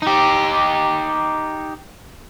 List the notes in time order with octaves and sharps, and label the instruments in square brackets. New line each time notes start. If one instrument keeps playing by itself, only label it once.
[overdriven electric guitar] D#4 G4